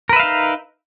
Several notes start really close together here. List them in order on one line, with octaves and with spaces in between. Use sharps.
A#4 B4 E5 F5 D#4